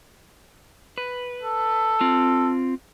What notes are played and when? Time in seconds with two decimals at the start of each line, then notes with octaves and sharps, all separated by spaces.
0.98 B4
1.42 A4
2.01 C4 F4